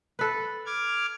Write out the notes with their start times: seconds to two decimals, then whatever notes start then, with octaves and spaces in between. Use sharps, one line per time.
0.19 A4 B4
0.66 D6 F6 G#6